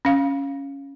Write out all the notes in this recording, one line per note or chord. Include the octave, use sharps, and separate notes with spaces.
C#4 F5